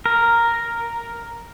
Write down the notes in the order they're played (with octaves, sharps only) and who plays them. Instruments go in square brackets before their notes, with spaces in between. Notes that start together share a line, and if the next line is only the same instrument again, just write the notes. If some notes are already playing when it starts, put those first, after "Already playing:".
[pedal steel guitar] A#4